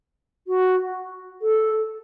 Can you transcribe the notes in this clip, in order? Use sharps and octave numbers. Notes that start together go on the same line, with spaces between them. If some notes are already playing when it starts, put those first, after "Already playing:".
F#4
A4